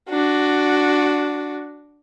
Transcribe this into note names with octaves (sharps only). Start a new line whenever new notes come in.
D4 F#4